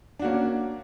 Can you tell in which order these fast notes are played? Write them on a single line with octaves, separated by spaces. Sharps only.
D4 F#4 A#3 C#4